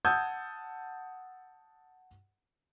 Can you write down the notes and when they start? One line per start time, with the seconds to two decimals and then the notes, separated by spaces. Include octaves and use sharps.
0.05 F#5 A5 D#6 E6 G6 G#6